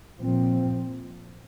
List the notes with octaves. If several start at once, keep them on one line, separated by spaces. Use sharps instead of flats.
A#2 F3 C4